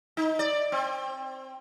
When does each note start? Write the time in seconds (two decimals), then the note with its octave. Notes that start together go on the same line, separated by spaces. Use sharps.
0.17 D#4
0.39 D5
0.72 C4